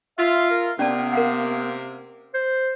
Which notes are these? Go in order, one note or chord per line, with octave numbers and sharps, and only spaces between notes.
F4 E5
A#4
C3 A#3 B3 C#4 D5 A5
A#4 F5 F#5
C5